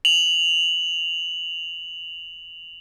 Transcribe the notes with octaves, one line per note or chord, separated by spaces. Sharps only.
F7 F#7